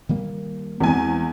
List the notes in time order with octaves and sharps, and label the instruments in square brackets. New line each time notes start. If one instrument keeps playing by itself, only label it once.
[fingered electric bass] D#3 G3 A#3
[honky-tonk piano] E2 G#5 [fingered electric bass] G#3 B3 C4